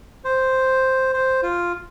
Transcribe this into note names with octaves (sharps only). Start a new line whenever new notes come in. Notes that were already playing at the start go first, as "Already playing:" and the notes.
C5
C5
F4